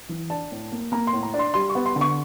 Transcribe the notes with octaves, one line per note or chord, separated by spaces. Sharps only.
E3
D4 A5
A2
A#3
A#3 A#5
C6
A2
A#5
D4
C6
G3 C6
C#6
B3
C6
D3
C#6